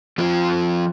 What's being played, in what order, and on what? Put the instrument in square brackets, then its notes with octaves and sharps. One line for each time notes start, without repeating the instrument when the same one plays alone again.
[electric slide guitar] F3 C4 F4 C5